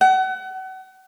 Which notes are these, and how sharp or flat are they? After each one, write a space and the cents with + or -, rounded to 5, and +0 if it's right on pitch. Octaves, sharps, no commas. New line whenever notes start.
F#5 +35